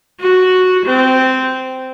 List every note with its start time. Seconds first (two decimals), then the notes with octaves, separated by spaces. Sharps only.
0.21 F#4
0.86 C4